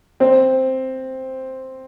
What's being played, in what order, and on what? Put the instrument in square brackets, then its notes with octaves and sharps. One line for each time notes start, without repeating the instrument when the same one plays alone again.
[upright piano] C4